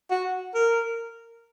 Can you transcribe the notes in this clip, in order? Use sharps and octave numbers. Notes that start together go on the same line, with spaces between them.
F#4
A#4